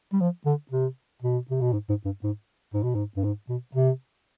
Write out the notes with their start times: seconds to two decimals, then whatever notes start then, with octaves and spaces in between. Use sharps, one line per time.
0.13 G3
0.21 F3
0.46 D3
0.71 C3
1.22 B2
1.51 C3
1.61 B2
1.73 G#2
1.89 G#2
2.05 G2
2.23 G#2
2.74 G#2
2.83 B2
2.95 G#2
3.16 G2
3.24 G#2
3.49 B2
3.75 C3